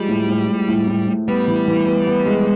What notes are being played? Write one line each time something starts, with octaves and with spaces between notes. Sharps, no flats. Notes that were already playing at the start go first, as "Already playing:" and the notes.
Already playing: F3 G3 G#3
A2
A2
A2
A2
A2
A2
G3 B3
E3
E3
B3
B3
G#3